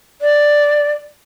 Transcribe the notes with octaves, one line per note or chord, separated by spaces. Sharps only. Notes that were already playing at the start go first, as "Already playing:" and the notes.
D5